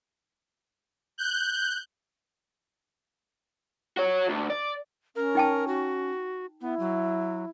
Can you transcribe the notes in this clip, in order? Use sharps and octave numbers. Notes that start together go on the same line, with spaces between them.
F#6 G6
F#4 C#5
D2
D5
C#4 A#4
D#4 G5 A5
F#4
B3 E4
F#3